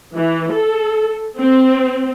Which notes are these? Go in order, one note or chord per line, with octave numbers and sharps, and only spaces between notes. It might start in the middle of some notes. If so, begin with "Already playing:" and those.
E3
A4
C4